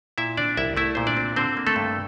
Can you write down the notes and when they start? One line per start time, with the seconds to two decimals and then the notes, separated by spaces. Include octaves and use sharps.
0.18 A#2 E4 E5
0.37 C4 D4 D5
0.57 C2 E4 E5
0.77 A3 E4 E5
0.95 A#2 C5
1.07 D4 D5
1.17 C4
1.36 D3 C4 C5
1.57 A#3
1.67 A3 A4
1.76 G2